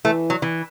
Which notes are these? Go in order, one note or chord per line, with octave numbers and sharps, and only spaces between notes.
E3 A3
F#3
E3